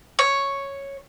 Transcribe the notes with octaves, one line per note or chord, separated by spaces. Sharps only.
C#5